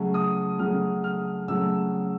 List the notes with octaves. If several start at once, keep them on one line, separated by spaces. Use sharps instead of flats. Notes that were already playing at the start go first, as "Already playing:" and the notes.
Already playing: C#3 F#3 A3 C#4
D#6
C#3 F#3 A3 C#4 F6
F6
C#3 F#3 A3 C#4 E6